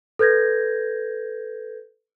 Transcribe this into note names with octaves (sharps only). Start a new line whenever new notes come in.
A4 B4 G6 G#6 A#6